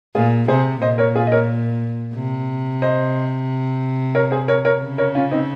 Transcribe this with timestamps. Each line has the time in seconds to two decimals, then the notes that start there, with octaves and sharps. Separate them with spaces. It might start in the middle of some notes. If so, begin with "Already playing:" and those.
0.15 A#2 F4 G#4
0.48 C3 G#4 C5
0.81 A#2 C5 D#5
0.98 A#4 C#5
1.15 F4 G#4
1.27 D#5
1.32 A#4 C#5
2.15 C3
2.82 C5 D#5
4.15 A#4 C#5
4.31 G#4 C5
4.48 A#4 C#5
4.65 A#4 C#5
4.82 C#3
4.98 A#4 C#5
5.15 C#4 F4
5.31 C4 D#4